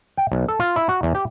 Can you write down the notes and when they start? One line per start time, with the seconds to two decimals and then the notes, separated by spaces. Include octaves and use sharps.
0.17 G5
0.32 B1
0.48 A4
0.60 F4
0.76 E4
0.89 F#4
1.03 E2
1.15 G4